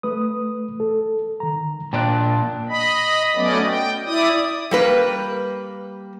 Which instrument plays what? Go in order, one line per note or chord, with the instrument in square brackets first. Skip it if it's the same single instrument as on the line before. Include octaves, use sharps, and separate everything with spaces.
[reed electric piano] A3 B4 D#6
A4
D#3 A#5
[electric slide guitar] A#2 D4 D5 [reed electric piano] G5 F#6
[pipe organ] D#5 B5
F#3 A3 B3 C#4 D5 D#5
G5
E4 D5 D#6
[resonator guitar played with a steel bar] G3 A#3 B4